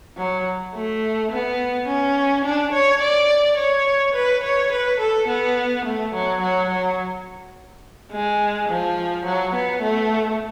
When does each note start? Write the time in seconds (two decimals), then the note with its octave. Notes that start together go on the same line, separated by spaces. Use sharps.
0.17 F#3
0.74 A3
1.31 B3
1.87 C#4
2.45 D4
2.73 C#5
3.02 D5
3.57 C#5
4.14 B4
4.44 C#5
4.72 B4
5.00 A4
5.27 B3
5.85 A3
6.14 F#3
6.42 F#3
6.70 F#3
8.12 G#3
8.69 F3
9.25 F#3
9.54 B3
9.82 A3